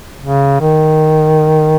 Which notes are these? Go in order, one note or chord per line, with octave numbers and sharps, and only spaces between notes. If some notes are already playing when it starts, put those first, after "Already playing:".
C#3
D#3